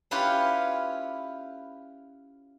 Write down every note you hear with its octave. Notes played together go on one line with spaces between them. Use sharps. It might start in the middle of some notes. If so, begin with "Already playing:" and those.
C#4 E4 F4 G4 B4 C#5